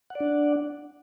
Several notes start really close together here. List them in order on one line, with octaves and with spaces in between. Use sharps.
F#5 D5 D4